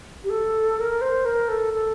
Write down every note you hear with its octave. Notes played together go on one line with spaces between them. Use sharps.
G4
A4
A#4
C5
A#4
A4
A4